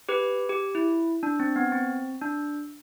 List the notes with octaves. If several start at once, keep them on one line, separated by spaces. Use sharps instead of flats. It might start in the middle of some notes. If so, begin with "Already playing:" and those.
G4 B4
G4
E4
D4
C4
B3
C4
D4